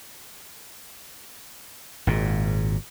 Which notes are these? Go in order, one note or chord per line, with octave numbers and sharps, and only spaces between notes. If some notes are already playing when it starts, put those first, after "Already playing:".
G#1 A#2